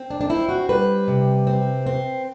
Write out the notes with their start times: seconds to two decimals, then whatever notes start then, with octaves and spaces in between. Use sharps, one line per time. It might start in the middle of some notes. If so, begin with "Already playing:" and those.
Already playing: C4
0.10 D4
0.21 D4
0.29 C4 E4
0.49 F#4
0.69 G3 B4
1.08 C3
1.47 C4
1.86 C4